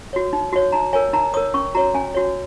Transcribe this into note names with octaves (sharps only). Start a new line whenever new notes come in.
F#4 C#5
D#4
F#4 C#5
D#4 A#5
A#4 C#5 G#5
D#4 A#5
A#4 C#5 D#6
C#4 C#6
F#4 C#5 A#5
C#4 G#5
F#4 C#5